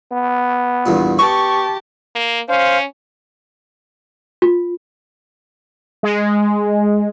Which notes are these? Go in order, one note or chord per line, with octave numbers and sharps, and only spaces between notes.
B3
E2 G2 A#2
B3 G4 A5 C#6
A#3
C#4 C5 F5
F4
G#3